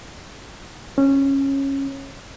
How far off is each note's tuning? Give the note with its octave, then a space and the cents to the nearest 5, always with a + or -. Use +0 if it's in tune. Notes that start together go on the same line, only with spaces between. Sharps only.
C#4 -15